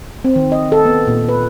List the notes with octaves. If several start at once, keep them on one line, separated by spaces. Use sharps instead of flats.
C4
D#3
D#5
A4
B3
A#2
B4